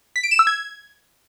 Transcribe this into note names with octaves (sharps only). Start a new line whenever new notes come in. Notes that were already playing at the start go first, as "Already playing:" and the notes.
B6
D7
E7
E6
G#6